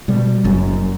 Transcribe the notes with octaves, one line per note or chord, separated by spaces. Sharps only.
B2 G3
F#1 F#2